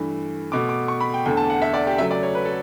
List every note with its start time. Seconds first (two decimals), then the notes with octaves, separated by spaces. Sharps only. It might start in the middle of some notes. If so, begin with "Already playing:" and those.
Already playing: G2 E3 A3
0.52 B2 A3 D6
0.69 D6
0.88 C#6
1.00 B5
1.14 G5
1.25 E2 D3 A3 G5
1.37 A5
1.50 F#5
1.62 E5
1.73 D5
1.87 G4
1.98 C#3 F#3 A3 E5
2.11 D5
2.23 C#5
2.35 B4
2.45 A4